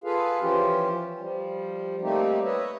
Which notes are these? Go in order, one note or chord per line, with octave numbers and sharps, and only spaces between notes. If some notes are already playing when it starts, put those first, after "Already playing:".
F4 G#4 A4 B4 F5
E3 F3 C#4 F4 G4
F3 G3
G3 A3 A#3 C4 D#4 G4
B4 C#5 D#5 E5